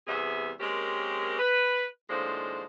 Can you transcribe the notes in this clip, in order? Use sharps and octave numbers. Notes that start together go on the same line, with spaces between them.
E2 C3 G3 B3 G#4 E5
G#3 A#3 C4 C#4 G4 A#4
B4
D#2 A2 F3 G#3 D4 C5